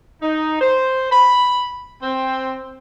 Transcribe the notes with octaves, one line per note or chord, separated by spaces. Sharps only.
D#4
C5
B5
C4